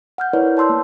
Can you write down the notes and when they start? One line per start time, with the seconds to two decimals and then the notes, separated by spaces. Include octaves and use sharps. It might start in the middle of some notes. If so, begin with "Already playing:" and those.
0.18 F#5 F6 G6
0.33 E4 A#4 B4 C#5 D5
0.57 C#5 A5 C6 E6 G6
0.69 A#3